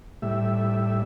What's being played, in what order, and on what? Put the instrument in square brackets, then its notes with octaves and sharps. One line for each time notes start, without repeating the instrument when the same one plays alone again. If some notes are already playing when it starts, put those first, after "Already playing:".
[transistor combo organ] A2 G3 E5